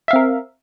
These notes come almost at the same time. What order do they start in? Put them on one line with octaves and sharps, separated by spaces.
E5 F5 C4 A#4